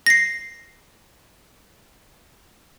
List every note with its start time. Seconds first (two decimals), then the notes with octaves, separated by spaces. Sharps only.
0.06 A#6 C7